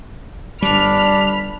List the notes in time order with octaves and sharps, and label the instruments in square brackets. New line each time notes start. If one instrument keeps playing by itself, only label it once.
[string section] G1 F6 [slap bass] G3 [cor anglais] D4 [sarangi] B5